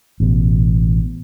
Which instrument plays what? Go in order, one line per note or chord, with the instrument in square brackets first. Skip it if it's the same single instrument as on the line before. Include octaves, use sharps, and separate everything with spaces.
[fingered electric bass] A1 B2